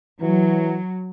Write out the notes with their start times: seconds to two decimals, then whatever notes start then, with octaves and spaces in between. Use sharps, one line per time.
0.21 E3 F#3